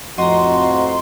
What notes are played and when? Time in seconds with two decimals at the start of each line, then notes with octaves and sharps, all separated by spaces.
0.18 F2 A2 F3 F#4 D#5 A#5 C6